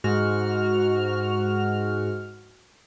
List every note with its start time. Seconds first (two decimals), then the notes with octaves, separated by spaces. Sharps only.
0.04 G#2 F#4 F6